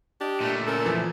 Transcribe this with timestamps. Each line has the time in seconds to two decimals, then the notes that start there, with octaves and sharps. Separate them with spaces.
0.20 D4 G4 D#5
0.41 A#2 A3
0.67 C#4 A4 A#4
0.85 E3 F3